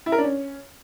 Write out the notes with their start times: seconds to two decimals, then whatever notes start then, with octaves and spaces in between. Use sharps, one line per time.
0.06 E4
0.12 A#4
0.18 D4
0.24 C#4